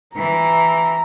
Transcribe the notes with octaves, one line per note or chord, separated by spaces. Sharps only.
E3 A#5